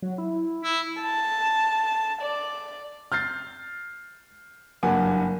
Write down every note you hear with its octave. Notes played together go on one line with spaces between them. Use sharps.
F#3
E4
E4
A5
D5
F6 G6 A6 C7
F#1 G2 A#3 F#5 G#5